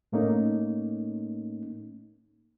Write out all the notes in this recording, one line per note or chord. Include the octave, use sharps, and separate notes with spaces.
A2 A3 A#3 C#4 D#4